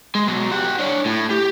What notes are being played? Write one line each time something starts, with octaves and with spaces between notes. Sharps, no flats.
G#3
B2 F#3
G4 F#5
D4 C#5
A2
G4